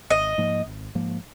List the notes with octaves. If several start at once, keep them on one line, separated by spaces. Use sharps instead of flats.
G#1 D#5
G#2 F3 A#3
G#1
G#2 F3 A#3